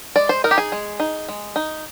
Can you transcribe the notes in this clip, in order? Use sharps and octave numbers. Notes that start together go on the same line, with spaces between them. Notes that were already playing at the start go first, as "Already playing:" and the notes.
G#3 D5
C5
D#4 A#4
G4
G#4
G#3
D#4
G#3
D#4